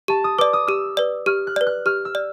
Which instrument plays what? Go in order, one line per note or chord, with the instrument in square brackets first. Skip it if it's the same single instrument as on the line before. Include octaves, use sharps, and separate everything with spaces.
[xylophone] G4 [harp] A5
[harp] D#6
[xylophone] B4 D5 [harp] D6
[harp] D#6
[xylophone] G4 [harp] E6
[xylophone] B4 D5
[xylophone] G4 [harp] F6
[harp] F#6
[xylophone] B4 D5
[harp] F#6
[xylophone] G4 [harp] F6
[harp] E6
[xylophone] D5